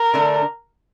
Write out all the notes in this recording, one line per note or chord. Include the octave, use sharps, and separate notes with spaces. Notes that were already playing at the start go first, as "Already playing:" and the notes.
Already playing: A#4
D3 A3 D4